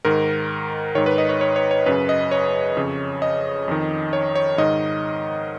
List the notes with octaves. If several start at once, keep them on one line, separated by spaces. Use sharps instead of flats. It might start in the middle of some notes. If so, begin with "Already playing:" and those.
G#2 D#3 A#4
G#2 D#3 C#5
B4
D#5
C#5
C#5
C#5
C#5
F#2 C#3 B4
D#5
C#5
F2 C#3
D#5
F2 D#3
C#5
C#5
G#2 D#3 D#5